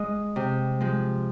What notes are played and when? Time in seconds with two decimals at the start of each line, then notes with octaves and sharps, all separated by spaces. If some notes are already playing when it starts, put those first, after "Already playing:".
Already playing: G#3 D#5
0.36 C3
0.81 F3 G#3